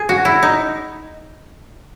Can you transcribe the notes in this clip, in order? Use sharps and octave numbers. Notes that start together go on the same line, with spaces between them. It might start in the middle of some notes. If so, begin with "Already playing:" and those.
Already playing: G#4
F#4
E4
D#4